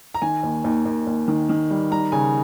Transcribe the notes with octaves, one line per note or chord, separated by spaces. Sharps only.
A#5
D#3 G#5
D#2
D#2
D#2
D#2
D#3
D#3
G3
G3 A#5
C#3 G#5